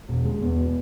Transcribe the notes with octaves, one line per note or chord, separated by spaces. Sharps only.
E1
G#3
E2
B2